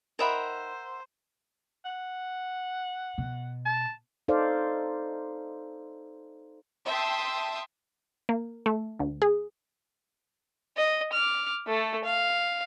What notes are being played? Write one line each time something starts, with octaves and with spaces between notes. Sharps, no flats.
D#3 A#4 C5 D#5 E5 F#5 B5
F#5
B2
A5
D#4 A4 C5 D5 F5
E5 G5 A5 C6 D#6
A#3
A3
D2
G#4
D#5
D6 F6
A3 A4
F5